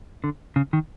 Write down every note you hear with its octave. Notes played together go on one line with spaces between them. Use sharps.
D3
C#3
D#3